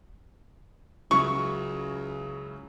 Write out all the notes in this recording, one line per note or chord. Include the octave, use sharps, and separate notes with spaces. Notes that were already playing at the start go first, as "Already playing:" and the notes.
C#2 C#3 F#3 E4 C#6